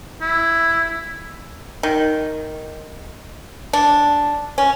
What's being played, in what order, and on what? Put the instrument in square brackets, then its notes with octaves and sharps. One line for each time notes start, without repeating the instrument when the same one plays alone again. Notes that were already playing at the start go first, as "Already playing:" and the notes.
[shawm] E4
[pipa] D#3
D4
C#4